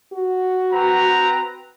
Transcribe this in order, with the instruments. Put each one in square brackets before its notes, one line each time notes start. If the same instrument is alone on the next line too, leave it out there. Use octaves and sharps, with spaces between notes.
[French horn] F#4
[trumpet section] C4 B4 A#5